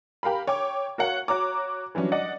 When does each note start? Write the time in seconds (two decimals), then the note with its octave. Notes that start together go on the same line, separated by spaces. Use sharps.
0.23 G4 A#4 F5 B5
0.47 C#5 G5 D6
0.98 F#4 A#4 C#5 F5 F#5
1.28 F#4 C#5 A#5 D6
1.95 E3 F#3 G3 C#4 D4
2.12 D5 D#5 F#5